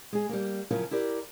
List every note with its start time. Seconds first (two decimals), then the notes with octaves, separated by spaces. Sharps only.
0.13 G#3 G#4
0.29 G3 A#3
0.71 C#3 F3 F#3 E4 F4 A#4
0.91 E4 G4 A#4 D5